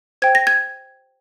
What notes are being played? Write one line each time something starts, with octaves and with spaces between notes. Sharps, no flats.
C5 G5 G#6
A#6
G#6